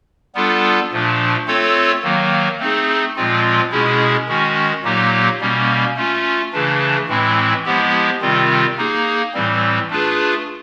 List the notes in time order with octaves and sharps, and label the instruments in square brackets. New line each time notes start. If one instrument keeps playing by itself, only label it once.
[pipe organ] G3 B3 D4 F4 A4
A#2 F3 A3 D4
A3 C4 F4 A4 C#5
D#3 F#3 A#3
A3 C4 D#4 G#4
A#2 F3 G#3 C4 F4
B2 G#3 C#4 E4 G#4
D#3 G#3 C#4 F#4
A#2 F#3 A#3 D#4 G4
B2 G3 A#3 C#4
A3 C#4 F4
C#3 E3 A3 D4
A2 E3 G#3 C4 E4
F3 G#3 B3 E4 G4
C3 D#3 G3 C4 F4
A#3 D#4 G#4
A2 E3 G3 C4
A3 D4 F4 G#4 B4